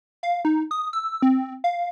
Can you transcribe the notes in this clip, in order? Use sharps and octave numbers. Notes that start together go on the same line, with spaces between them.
F5
D#4
D#6
E6
C4
F5